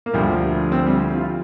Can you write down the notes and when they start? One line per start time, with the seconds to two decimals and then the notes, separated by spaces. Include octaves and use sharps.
0.06 A#3
0.13 D2 D3 F3 G3
0.72 C4
0.86 G3
1.15 F4